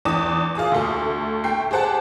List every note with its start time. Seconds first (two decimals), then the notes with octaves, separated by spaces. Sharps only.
0.05 E2 D4 D6 D#6 E7
0.55 F4 G#4 D6 D#6
0.72 D2 A3
1.44 A3 G5 C7
1.71 G4 G#4 C5 F#5 A5